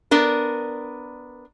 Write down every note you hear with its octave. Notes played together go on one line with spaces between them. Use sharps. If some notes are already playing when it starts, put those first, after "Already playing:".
B3 D4 A#4